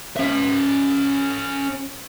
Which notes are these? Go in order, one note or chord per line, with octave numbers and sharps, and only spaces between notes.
C#4 E5